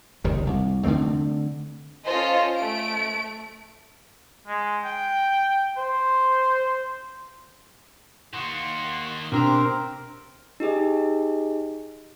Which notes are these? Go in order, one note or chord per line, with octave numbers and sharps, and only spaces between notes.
F#1 C#2 C3 D#3
C2
D3 D#3 A3 C4
C#4 F4 A4 C5 D#5
A3 D7
G#3
G5
C5
D#3 A#3 F#5 C6 C#6
B2 C4 D4 G4 A#4 C5 A#5
D#4 G4 G#4 D#5